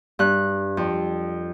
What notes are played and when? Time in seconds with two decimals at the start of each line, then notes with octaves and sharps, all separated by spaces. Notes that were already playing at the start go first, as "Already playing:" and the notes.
0.19 G2 F#6
0.77 F2